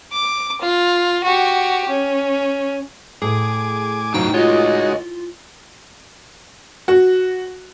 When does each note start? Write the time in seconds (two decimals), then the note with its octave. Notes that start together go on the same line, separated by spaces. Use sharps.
0.12 D6
0.61 F4
1.24 F#4 G4
1.89 C#4
3.22 A2 G#4 G#5 D6
4.14 F#3 D#4 C5 F5 G5
4.34 G#3 D#4 F4 F#4 C#5 D#5
6.88 F#4